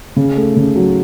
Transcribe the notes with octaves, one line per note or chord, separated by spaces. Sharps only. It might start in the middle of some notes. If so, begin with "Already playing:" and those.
C#3
A3
C#3
F#3